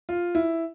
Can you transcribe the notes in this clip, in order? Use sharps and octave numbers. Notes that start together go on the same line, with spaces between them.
F4
E4